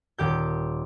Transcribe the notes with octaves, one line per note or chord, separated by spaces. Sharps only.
D#1 G4 G6